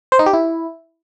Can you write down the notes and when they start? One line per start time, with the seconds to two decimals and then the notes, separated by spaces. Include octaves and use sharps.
0.12 C5
0.19 D#4
0.26 G4
0.33 E4